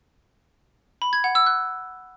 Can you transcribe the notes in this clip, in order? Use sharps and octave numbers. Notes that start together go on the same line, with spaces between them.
B5
G#6
F#5
E6
F#6